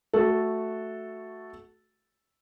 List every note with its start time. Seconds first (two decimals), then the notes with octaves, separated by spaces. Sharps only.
0.13 A3 F#4 A4